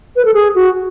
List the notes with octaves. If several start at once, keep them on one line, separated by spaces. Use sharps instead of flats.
B4
A4
G#4
F#4